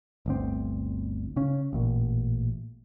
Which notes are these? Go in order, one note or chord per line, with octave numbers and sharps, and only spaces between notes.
G1 D2 C4
C#3 C#4
A1 A#2